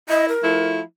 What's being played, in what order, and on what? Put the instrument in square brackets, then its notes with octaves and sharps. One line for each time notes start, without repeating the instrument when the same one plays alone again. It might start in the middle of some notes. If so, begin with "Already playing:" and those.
[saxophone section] E4 [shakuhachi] D#5
[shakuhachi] A#4
[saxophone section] F3 A3 E4